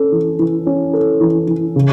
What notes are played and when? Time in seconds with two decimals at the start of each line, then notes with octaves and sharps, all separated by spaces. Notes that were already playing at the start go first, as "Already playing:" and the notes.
Already playing: C#4 A4
0.12 E3
0.39 E3
0.66 C#4
0.93 A4
1.21 E3
1.48 E3
1.76 C#3